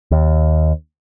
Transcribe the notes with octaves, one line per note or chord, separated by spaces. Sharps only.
D#2